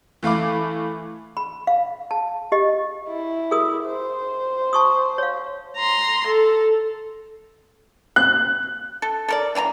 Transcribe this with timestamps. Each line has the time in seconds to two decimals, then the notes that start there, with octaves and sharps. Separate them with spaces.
0.23 E3 A3 F5 B5 D6
1.37 B5
1.67 F5
2.11 A5
2.52 G4 D#5
3.08 E4
3.51 G#4 A#4 D#6
3.85 C5
4.73 A5 C#6 D#6
5.18 C#5 F5
5.77 A#5 C6
6.27 A4
8.16 F#6
9.02 A4
9.28 A4 A#4 D5
9.55 E3 A#3 G#5 A#5